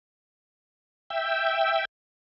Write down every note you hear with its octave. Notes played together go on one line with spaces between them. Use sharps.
E5 G5